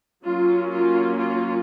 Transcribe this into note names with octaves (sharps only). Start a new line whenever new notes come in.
F#3 A#3 C#4 F4
F4
F4